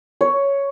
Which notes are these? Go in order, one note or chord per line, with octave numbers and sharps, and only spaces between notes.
C#5